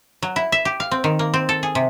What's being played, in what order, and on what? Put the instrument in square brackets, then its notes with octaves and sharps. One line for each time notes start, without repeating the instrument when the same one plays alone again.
[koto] F#3
E4
E5
G4
F5
C4
D#3
A#3
C4
A4
G#4
C3